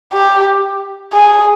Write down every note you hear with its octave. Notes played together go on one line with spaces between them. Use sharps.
G4
G#4